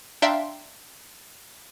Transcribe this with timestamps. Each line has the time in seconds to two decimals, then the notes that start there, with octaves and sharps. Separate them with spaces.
0.22 D4 E5 F5 G5 A#5 C6